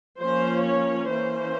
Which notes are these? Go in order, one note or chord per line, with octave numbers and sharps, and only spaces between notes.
F3 A#3 C#4 C5
C#5
E3 A#3 C#4 C5